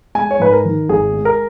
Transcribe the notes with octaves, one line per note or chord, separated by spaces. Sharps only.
G#3 G#5
C#5
G#2 B4
A#4
D#3
G#1 G#4
G#3
A#4